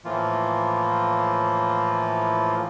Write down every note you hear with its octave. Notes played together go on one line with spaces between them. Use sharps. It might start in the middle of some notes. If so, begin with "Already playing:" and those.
A2 E3 F3 A#3 F4